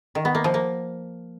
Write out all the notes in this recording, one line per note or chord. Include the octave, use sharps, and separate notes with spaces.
D#3
B3
A#3
F3
A#3